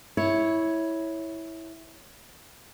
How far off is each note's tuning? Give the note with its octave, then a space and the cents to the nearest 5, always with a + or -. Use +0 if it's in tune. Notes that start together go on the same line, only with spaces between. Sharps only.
E4 -10 C#5 +0